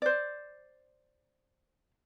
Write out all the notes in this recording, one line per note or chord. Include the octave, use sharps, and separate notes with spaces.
C5 D5